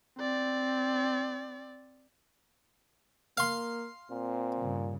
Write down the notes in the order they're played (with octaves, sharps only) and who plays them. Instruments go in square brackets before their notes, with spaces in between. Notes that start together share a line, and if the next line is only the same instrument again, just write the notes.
[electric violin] C4 D5
[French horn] A#3 [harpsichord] F5 C6
[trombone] A#2 [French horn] C4
[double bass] G2 C#3